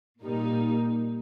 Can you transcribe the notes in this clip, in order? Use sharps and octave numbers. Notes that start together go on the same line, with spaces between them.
A#2 G3 A#3 D#4